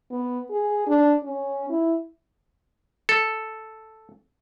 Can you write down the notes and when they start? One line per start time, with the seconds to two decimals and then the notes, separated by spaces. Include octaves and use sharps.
0.11 B3
0.50 G#4
0.87 D4
1.23 C#4
1.69 E4
3.09 A4